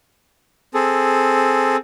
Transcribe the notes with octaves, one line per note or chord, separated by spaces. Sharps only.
C4 G#4 A4